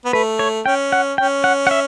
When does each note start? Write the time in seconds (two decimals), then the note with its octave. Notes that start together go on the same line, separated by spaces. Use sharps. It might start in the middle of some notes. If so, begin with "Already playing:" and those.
0.05 B3
0.13 A3 B4
0.39 C#5
0.66 C#4 G5
0.92 F#5
1.18 C#4 G5
1.44 F#5
1.67 F#5
1.71 E5